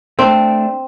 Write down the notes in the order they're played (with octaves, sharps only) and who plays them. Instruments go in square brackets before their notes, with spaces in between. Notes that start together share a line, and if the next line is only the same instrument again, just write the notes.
[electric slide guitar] A3 D4 [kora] C4